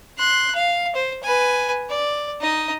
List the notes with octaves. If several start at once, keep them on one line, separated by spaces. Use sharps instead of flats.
C6 F#6
F5
C5
B4 G#5
D5
D#4 D#5